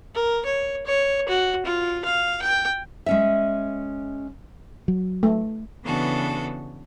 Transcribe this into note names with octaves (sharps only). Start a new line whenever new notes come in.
A#4
C#5
C#5
F#4
F4
F5
G5
G#3 C#4 E5
F#3
A3
C#3 E3 B3 D4 F#4 A4